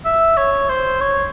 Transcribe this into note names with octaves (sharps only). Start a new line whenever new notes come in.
E5
C#5
C5
C#5